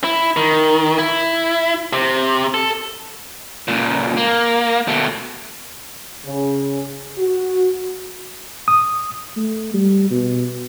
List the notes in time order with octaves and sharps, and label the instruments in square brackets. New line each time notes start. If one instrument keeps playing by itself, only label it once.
[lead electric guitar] E4
D#3
E4
C3
A4
C#2 A#2
A#3
B2 A3
[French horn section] C#3
F#4
[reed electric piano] D#6
[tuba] A3
G3
B2